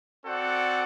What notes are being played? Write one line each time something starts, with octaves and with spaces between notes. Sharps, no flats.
C4 F#4 A4 D5 F#5